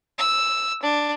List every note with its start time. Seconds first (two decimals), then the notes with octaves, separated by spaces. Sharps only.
0.19 E6
0.83 D4